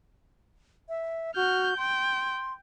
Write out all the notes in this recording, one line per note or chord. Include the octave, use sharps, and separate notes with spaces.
E5
F#4 F6 G6
G5 C6